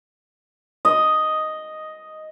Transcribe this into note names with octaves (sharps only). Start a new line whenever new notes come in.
D#5